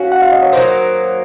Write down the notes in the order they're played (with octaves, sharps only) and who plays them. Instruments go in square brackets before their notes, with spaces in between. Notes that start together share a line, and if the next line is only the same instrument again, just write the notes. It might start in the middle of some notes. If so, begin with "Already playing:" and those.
Already playing: [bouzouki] F#3 C#4 F#4 [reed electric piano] F5
[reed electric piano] F#5
F5
D#5
C#5
[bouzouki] F#3 A#3 D#4 [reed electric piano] C5